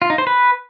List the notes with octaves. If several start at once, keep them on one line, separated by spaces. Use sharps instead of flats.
F4
D#4
C5
B4